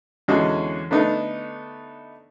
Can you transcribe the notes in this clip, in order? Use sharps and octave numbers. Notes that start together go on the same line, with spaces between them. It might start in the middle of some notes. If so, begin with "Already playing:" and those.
E2 D3 G#3 C#4 F#4 D#5
D3 A3 B3 D4 D#4 A4